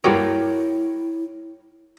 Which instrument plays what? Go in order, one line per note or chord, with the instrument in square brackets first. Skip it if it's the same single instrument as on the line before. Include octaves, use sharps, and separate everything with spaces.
[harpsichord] G2 F#4 D6 [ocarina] E4 [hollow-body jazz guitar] A#4 C#5 G5